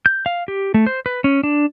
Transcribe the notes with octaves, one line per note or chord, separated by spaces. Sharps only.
G6
F5
G4
A3
C5
B4
C#4
D4